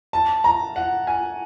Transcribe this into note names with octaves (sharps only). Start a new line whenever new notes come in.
A5
A#5
F#5
G#5